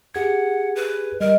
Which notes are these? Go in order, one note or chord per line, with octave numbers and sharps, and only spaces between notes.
G4 G#4 F#5 G#6
B4
G3 A#4 D#5